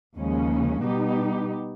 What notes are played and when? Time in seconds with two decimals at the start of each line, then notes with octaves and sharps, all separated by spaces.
0.16 D#2 C#3 F3 G#3 C#4
0.83 B2 G3 B3 D#4 G4